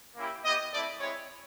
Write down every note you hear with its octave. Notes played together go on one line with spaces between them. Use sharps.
A#3 C#4 E4 G4
B3 E4 G4 D#5
A3 C4 E4 D5
G#3 C4 E4 C#5